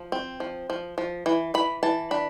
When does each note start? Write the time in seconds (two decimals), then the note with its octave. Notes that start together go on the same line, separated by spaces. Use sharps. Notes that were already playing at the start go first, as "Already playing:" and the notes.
Already playing: F3
0.12 C4
0.40 F3
0.70 F3
0.98 F3
1.26 E3
1.54 E3 B5
1.83 E3 A5
2.11 D4 B5